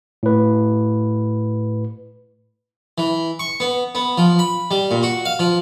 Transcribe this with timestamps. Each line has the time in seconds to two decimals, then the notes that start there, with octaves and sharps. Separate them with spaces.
0.23 A2 B4
2.98 E3
3.39 C#6
3.60 B3
3.95 B3
4.18 F3
4.39 B5
4.71 G3
4.91 A#2
5.03 F#4
5.25 F5
5.39 F3